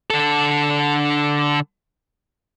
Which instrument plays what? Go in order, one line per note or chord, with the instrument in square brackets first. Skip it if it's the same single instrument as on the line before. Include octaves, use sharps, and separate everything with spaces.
[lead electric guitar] D3 A4